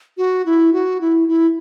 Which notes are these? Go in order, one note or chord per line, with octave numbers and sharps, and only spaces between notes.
F#4
E4
F#4
E4
E4